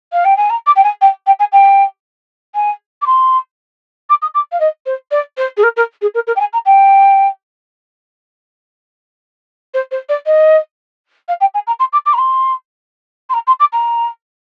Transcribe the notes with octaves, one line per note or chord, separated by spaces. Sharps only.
F5
G5
G#5
A#5
D6
G5
G#5
G5
G5
G#5
G5
G#5
D6
C6
D6
D#6
D6
F5
D#5
C5
D5
C5
G#4
A#4
A#4
G#4
A#4
A#4
G5
G#5
A#5
G5
C5
C5
D5
D#5
F5
G5
G#5
A#5
C6
D6
D6
A#5
C6
C6
A#5
C6
D6
A#5